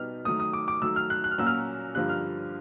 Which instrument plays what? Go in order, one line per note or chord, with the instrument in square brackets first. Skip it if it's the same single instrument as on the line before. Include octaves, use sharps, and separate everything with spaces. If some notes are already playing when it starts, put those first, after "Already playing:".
Already playing: [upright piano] B2 G3 B3 D#4 G4 [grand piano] F6
[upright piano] D#3 F#3 A3 [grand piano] D#6
[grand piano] D#6
D6
D6
[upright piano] D#3 F#3 A3 [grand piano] E6
[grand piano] F6
F#6
F#6
F6
[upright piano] A#2 F#3 A#3 C#4 F#4 [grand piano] E6
[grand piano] F6
[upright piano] G2 D3 F3 A#3 [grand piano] F#6
[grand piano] F6